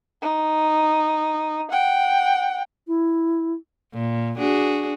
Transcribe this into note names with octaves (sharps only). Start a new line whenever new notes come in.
D#4
F#5 G5
E4
A#2
D4 F#4 G#4